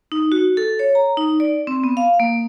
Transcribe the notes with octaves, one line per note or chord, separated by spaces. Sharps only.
D#4
F#4
A4
C#5
A#5
D#4
D5
C4
B3
F5
A#3